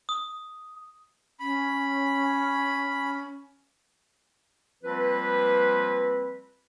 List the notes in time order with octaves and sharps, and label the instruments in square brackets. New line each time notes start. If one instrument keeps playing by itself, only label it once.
[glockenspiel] D#6
[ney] C#4 [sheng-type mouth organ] B5
[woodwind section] F3 G3 A#3 C4 F4 B4